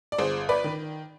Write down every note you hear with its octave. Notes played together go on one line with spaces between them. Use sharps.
D5
G1 G#4 C5
B4 D5
D#3